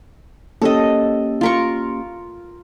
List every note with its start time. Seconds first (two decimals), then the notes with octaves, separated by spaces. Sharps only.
0.62 A#3 C#4 G4 A4 D#5
1.41 F4 A#4 C#6